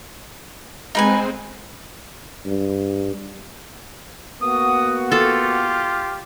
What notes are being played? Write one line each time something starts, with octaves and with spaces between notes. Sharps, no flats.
G#3 C4 D#4 B4 G#5
G2
A#3 B3 F#4 D#6
F4 G4 A4